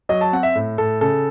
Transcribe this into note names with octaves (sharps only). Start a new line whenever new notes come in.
F#3 D#5
A5
C4 F#5
E5
A2
A2 A4
C#3 A4